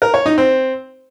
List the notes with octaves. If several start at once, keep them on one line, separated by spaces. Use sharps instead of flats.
A#4
C#5
D#4
C4